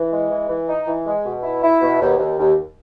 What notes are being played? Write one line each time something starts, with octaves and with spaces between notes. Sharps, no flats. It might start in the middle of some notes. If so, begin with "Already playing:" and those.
Already playing: E3
G#3
E3
E3
D#4
E3
G#3
B2
E4
E4
B2
D#2
D#2
D#2